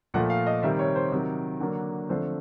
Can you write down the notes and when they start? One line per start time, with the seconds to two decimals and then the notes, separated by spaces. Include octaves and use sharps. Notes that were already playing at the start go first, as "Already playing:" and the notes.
0.14 A#2 F3 A3 F#5
0.30 F5
0.47 D#5
0.63 C3 D#3 G3 C4 E5
0.79 C#5
0.95 C5
1.12 C3 D#3 F#3
1.60 D3 F#3 A#3 D4
2.09 D3 F3 A3 C4 C5